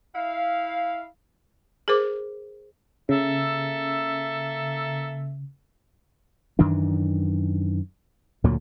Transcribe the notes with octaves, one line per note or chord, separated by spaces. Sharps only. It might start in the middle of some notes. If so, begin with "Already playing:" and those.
E4 F5
G#4 A#4 C5 D6
C#3 A#3 A4 E5
F#2 D#3 E3 D4
D2 A#2 D3 F#3